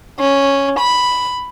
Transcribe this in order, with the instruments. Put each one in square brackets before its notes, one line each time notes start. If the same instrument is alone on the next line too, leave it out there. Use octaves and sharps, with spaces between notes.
[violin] C#4
B5